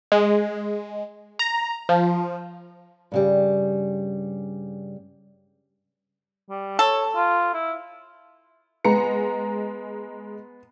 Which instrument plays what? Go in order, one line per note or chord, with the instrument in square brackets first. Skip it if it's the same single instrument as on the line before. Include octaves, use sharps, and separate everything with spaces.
[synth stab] G#3
A#5
F3
[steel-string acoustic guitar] G2 C#3 G3
[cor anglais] G3
[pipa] A4 [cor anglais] C#5
[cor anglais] F4
E4
[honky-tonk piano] G#3 A#5 C#7 [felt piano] B3